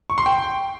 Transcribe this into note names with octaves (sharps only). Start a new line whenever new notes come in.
C#6
C6
G5